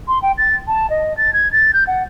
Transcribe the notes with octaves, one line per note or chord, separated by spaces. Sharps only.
C6
G5
A6
A5
D#5
A6
G#6
A6
G6
F#5